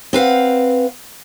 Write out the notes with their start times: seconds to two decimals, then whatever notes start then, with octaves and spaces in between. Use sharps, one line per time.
0.13 C4 B4 F5 F#5